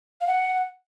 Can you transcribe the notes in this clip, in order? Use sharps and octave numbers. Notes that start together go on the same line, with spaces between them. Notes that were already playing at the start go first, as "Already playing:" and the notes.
F5
F#5